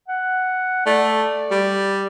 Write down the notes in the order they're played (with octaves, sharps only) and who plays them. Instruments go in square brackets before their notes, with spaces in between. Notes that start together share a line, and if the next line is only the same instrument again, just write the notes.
[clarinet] F#5
[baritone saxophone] A3 [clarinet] D5
[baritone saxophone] G3